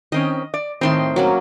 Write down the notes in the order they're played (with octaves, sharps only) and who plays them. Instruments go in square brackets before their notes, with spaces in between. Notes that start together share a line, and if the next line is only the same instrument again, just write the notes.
[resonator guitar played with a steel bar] D#3 C4 C#4 [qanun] D#5
[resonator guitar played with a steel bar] D5
[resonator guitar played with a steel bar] A2 D#3 C4 [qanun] D#5 C6
[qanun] F#3 A#3 C#4